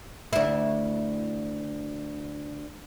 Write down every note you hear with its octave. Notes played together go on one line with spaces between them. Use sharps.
D2 E4